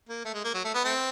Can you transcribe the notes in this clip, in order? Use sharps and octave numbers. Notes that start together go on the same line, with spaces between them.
A#3
A3
G#3
A#3
F#3
A3
B3
A3 C4